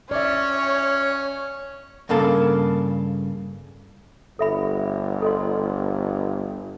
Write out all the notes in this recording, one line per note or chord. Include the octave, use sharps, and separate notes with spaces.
C#4 C#5 D5 E5
G2 C#3 A#3 A4
G1 A4 E5 B5
A4 D#5 C6